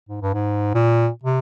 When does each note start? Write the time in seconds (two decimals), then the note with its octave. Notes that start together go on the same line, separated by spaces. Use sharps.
0.09 G#2
0.22 G2
0.34 G#2
0.75 A#2
1.24 C3